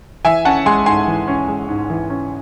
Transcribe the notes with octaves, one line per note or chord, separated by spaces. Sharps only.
E3 E5 G#5
C#4 F#5 A5
G#3 G#5 C6
G#2 G#5 C6
E3
C#4
G#3
G#2
E3
C#4